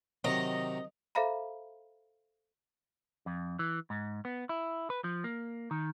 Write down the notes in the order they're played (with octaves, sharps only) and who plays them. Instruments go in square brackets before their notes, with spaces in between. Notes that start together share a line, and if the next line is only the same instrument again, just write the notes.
[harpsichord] C3 D#3 F#3 [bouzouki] D#5
[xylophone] A4 C5 E5 F5 A#5 B5
[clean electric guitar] F2
E3
G#2
B3
E4
B4
F3
A#3
D#3